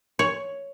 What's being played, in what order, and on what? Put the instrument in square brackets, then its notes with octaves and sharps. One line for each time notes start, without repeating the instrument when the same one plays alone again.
[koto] C#5